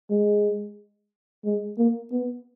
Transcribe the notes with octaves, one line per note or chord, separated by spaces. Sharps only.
G#3
G#3
A#3
B3